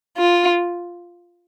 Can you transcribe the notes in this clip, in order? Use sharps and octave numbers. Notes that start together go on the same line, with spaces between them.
F4